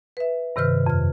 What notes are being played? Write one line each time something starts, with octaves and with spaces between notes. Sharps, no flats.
B4 E5
G2 C3 D#3 B4 F6
F2 F6